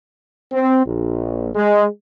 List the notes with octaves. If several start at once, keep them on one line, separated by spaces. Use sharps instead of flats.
C4
A#1
G#3